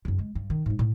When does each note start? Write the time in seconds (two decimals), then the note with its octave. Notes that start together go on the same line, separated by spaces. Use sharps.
0.05 F#2 C#3
0.19 G#3
0.35 G2
0.50 D#3
0.66 G#2 G3
0.79 A2